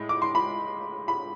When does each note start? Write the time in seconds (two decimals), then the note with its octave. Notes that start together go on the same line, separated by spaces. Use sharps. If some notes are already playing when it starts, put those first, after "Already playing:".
Already playing: A2 G#3
0.09 D6
0.22 C6
0.35 B5
1.08 B5